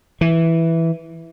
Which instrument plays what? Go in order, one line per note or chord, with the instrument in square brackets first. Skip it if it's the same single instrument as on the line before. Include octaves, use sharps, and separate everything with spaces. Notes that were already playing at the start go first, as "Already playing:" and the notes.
[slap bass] E3